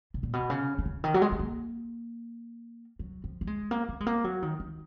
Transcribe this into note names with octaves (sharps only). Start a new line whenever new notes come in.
B2
A#2
B2
C#3
D#3
C#3
D#3
F#3
G#3
G#3
A#3
F#3
F3
A#3
G#3
A#3
B3
G#3
A#3
F#3
D#3
D#3